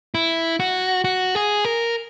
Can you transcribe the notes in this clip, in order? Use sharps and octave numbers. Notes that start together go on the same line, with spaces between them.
E4
F#4
F#4
G#4
A#4